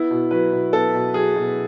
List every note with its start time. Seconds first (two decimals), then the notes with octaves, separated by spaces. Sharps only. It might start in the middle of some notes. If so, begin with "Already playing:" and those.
Already playing: B3 E4
0.11 B2
0.31 F#3 B4
0.52 B2
0.73 B3 A4
0.95 B2
1.14 F#3 G#4
1.36 B2